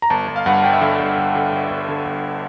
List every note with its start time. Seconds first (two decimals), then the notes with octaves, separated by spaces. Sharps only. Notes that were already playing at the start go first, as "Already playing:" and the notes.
0.02 A#5
0.10 G1 A5
0.28 G1
0.36 F5
0.46 G2 F#5
0.64 G1 G5
0.73 E5
0.81 D3 F5
0.99 G2
1.17 G1
1.35 D3
1.52 G1
1.70 G1
1.88 D3
2.05 G1